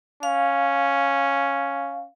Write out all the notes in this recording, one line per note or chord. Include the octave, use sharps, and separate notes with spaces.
C#4 F5